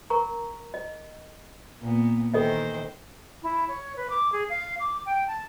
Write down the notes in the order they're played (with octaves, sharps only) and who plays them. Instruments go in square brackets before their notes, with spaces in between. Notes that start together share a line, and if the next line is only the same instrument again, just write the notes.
[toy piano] A#4 A#5 C#6
D#5
[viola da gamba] A#2 B3
[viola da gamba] D#3 E3 C5 [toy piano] A4 D#5 E5
[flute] E4
C#5
B4
D6
G#4
F5
D6
G5
A5